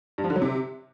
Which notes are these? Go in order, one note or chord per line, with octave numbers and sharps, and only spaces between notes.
G2
F3
D3
F#3
C3